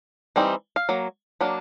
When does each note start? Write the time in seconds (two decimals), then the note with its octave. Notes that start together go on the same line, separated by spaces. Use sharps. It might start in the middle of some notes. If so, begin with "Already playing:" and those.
0.36 E3 G3 C4 D#4
0.76 F5
0.89 F#3 A#3
1.41 F#3 A#3 D4